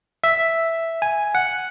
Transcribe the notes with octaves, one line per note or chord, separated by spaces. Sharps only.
E5
G#5
F#5